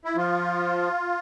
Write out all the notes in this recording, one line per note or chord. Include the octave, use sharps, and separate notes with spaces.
E4
F3 F4